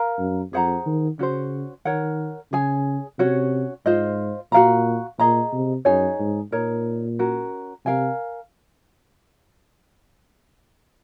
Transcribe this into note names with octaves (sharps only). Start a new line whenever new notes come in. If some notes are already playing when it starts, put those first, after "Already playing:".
Already playing: A#4 F5 A#5
F#2
F2 G#4 C5 F#5 A#5
D#3
C#3 C#4 F#4 C5
D#3 A#4 C#5 F#5
C#3 G#4 C#5 G#5
C3 C#4 F#4 C#5
G#2 F4 C5 D#5
A#2 F#4 A#4 F5 A#5
A#2 G#4 D#5 A#5
C3
F#2 D#4 G#4 C#5 G#5
G#2
A#2 D#4 A#4 C#5
C#4 F#4 A#4
C3 A#4 F5 G#5